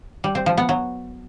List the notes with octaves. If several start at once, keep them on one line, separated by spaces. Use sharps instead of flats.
G3
C4
F3
B3
F#3